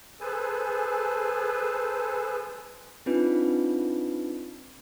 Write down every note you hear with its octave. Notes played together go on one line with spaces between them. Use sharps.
G#4 A4 B4 C5 G#5 A5
C4 D4 D#4 F4 B4